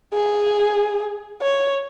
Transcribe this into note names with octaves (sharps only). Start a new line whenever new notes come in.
G#4
C#5